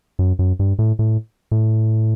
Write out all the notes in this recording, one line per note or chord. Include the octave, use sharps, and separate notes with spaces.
F#2
F#2
G2
A2
A2
A2